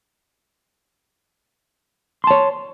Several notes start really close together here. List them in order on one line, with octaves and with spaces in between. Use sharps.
C6 A5 C#5